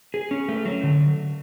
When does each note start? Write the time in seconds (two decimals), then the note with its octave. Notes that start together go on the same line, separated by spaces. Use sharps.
0.14 G#4
0.31 C#4
0.49 A3
0.65 F#3
0.83 D3